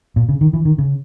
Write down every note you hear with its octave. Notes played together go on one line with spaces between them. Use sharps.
A#2
C#3
D#3
E3
D#3
C#3